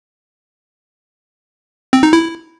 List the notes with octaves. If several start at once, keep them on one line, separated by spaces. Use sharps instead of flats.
C4
D#4
E4